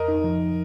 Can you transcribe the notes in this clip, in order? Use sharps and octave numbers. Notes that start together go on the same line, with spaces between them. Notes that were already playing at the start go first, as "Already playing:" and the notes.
Already playing: F2 A#4 D#5
D#4
F3